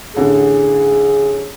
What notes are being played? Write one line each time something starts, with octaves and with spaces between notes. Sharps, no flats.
A1 D3 G#4